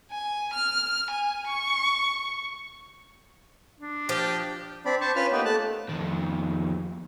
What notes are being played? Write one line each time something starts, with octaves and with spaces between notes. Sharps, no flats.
G#5
F6
G#5
C#6
D4
F3 G4
C4 D4 D5 B5
C5 A5 C#6
C#4 F4 B4 B5 F6
A#3 B3 D#4 G4 B4
A3 A5 F#6
F2 D#3